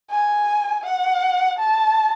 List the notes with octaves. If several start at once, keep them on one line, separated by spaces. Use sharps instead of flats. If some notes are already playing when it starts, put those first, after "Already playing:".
G#5
F#5
A5